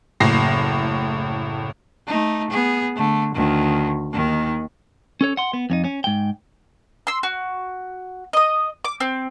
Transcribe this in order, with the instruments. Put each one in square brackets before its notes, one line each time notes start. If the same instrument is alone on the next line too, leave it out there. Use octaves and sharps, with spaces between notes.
[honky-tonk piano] F#1 A2 A#6 C7
[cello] A3 D#4
B3 G#4
D3 A3
D2 D#3
D#2 D#3
[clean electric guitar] C#4 A4 C#5
F#5 C6
B3
F2 C#4 D#4
C#4
G#2 G5
[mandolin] C6 E6
F#4
D#5 D#6
D6
C4